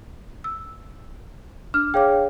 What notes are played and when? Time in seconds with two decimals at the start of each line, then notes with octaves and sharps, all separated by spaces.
0.44 E6
1.74 D4 F6
1.94 G#4 C#5 F5 G5 D6